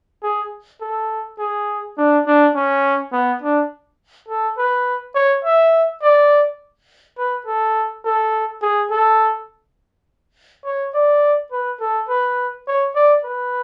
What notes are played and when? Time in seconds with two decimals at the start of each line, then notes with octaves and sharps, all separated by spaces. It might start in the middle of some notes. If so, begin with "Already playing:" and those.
0.23 G#4
0.81 A4
1.39 G#4
1.98 D4
2.27 D4
2.55 C#4
3.12 B3
3.42 D4
4.28 A4
4.58 B4
5.15 C#5
5.45 E5
6.02 D5
7.18 B4
7.46 A4
8.05 A4
8.62 G#4
8.91 A4
10.65 C#5
10.94 D5
11.52 B4
11.80 A4
12.09 B4
12.68 C#5
12.95 D5
13.24 B4